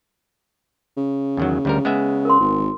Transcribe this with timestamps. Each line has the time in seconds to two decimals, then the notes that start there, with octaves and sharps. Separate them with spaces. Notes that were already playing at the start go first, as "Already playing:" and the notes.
0.97 C#3
1.37 E2 D#3 F#3
1.65 D2 G3 A#4
1.85 G#3 B3 E5
2.25 A#4 C6
2.40 G#1